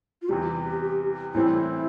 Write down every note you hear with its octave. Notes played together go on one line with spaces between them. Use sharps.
F4
E2 C3 G3 G4
A2 E3 G3 C4 E4